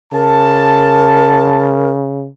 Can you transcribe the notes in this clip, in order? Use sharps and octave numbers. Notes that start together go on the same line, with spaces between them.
C#3 A#4 A5